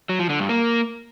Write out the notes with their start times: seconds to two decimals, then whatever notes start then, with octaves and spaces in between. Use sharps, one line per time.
0.09 F#3
0.19 F3
0.29 D3
0.39 G2
0.49 A#3